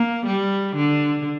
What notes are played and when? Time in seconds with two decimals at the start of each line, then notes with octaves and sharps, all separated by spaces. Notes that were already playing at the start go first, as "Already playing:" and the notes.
Already playing: A#3
0.27 G3
0.76 D3